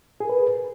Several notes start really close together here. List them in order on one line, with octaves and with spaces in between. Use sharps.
G#4 A#4 B4